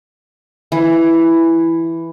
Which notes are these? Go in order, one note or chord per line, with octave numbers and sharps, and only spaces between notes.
E3